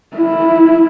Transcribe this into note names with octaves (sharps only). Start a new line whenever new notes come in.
E4